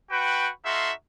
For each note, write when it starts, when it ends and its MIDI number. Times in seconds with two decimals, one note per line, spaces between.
0.11 0.49 66
0.11 0.49 71
0.11 0.49 79
0.65 0.92 63
0.65 0.92 66
0.65 0.92 69
0.65 0.92 76
0.65 0.92 77
0.65 0.92 84